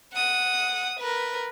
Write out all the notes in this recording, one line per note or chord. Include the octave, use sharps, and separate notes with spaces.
F#5 D#6
A#4 B4